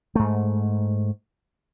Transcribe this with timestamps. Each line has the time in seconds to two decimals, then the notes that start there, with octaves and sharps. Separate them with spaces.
0.15 G#2 A3